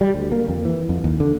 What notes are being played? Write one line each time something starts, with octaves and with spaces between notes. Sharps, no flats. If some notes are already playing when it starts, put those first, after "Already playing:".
G3
D2
A#3
F2
E3
F2
D#2
D3